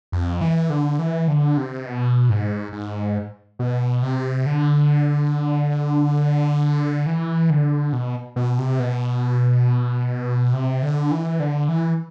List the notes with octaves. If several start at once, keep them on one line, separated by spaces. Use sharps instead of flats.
F2
E3
D3
E3
D3
C3
B2
G#2
G#2
B2
C3
D3
E3
D3
B2
B2
C3
B2
C3
D3
E3
D3
E3